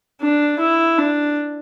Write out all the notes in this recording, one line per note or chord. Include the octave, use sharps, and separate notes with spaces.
D4
E4
D4